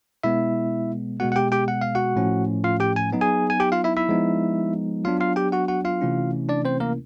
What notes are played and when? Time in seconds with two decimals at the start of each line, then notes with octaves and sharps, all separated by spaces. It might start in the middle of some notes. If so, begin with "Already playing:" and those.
0.23 B2 G#3 B3 E4 E5
1.20 B2 G#3 B3 F#4 F#5
1.32 F#5
1.36 G4 G5
1.52 G4 G5
1.68 F#5
1.81 F5
1.95 F#4 F#5
2.16 A2 F3 A3 C#4
2.64 F4 F5
2.80 G4 G5
2.96 G#5
3.13 F#3 B3 D#4
3.21 G#4 G#5
3.50 G#5
3.60 G4 G5
3.72 F4 F5
3.84 E4 E5
3.96 E4 E5
4.09 F3 G#3 B3 D#4
5.05 F#3 B3 D4 F4 F5
5.20 F4 F5
5.36 G4 G5
5.52 F#4 F#5
5.68 F#4 F#5
5.85 F4 F5
6.01 C3 E3 A3 C#4 E4
6.49 D4 D5
6.65 C4 C5
6.80 A#3 A#4